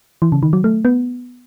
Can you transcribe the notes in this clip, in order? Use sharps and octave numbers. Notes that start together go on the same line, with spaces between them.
E3
C#3
D#3
F#3
A3
B3